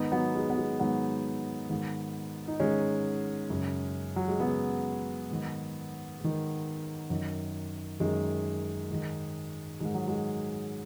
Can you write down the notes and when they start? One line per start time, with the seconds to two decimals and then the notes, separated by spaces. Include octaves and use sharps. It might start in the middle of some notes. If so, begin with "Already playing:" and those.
Already playing: G#2 D#3 B3 D#4
0.12 F#3 B3
0.35 G#3
0.50 B3
0.57 G#3
0.79 G#2 D#3 F#3 B3
1.70 G#2 D#3
2.48 D#4
2.60 G#2 D#3 G#3 C#4
3.50 F#2 C#3
4.16 F#3
4.28 G#3
4.39 F#2 C#3 F#3 B3
5.30 G#2 D#3
6.20 G#2 D#3
7.10 F#2 D#3
8.00 F#2 D#3 G#3
8.90 G#2 D#3
9.80 G#2 D#3 G#3
9.94 F#3
10.08 G#3